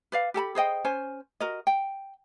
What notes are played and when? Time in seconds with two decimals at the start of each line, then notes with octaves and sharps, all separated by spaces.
0.12 B4 D5 F5
0.34 G4 A4 A5 B5
0.55 G#4 C5 D#5 G5
0.84 C#4 C5 G#5
1.40 F#4 A#4 D#5
1.67 G5